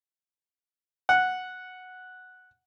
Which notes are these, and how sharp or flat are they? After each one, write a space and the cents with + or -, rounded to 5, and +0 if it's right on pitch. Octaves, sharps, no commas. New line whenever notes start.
F#5 -5